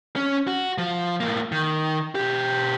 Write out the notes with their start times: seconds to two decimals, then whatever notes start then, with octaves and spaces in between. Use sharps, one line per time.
0.16 C#4
0.47 F#4
0.78 F3
1.20 A2 A#3
1.52 D#3
2.15 B2 G4